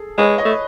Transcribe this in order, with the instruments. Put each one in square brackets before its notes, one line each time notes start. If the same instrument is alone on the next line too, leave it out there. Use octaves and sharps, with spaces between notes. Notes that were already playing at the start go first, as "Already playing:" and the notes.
Already playing: [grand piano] G#4 A4
[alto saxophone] G#3 [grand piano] B4 C#5
[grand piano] C#5 D#5
[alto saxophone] A3